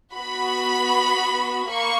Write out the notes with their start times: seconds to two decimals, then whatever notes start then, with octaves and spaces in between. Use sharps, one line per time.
0.14 B3 F#4 B5
1.70 A#3 C#6